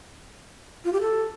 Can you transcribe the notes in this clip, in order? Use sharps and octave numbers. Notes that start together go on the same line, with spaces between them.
F4
G4
A4